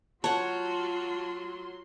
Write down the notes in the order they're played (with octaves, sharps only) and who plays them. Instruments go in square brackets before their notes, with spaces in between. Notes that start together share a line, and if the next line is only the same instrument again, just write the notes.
[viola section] F#3 C6 [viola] F4 F#4 [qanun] C#5 F#5 [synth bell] A5